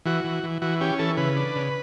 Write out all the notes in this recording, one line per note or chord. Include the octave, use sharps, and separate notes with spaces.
E3 F#4
E3
E3
E3 F#4
C#4 G4
E3 A4
C#3 B4
D4
C#3